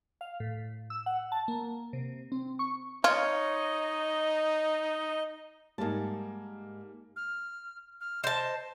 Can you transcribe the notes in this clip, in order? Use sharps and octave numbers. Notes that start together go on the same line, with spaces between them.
F5
A2
E6
F#5
A5
A#3
C3
C4
C#6
D#4 F4 C#5 D#5
G#2 G3 A#3 A5
F6
F6
C5 D#5 A5